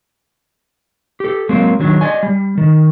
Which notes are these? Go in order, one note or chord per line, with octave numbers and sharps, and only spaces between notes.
G4 A4
F#3 G#3 A#3 C4
D#3 F#3 D4
D5 D#5 G#5
G3
D#3